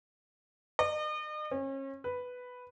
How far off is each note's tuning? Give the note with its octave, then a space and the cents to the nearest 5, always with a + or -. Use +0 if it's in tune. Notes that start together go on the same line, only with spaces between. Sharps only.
D#5 -40
C#4 -35
B4 +5